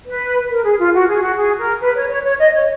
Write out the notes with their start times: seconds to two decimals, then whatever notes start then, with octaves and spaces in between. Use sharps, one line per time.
0.06 B4
0.50 A#4
0.64 G#4
0.78 F4
0.93 F#4
1.08 G#4
1.21 F#4
1.37 G#4
1.58 A#4
1.80 B4
1.95 C#5
2.09 C#5
2.23 C#5
2.38 D#5
2.53 C#5